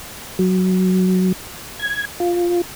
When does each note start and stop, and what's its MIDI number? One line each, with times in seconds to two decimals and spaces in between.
0.39 1.32 54
1.80 2.05 92
2.20 2.61 65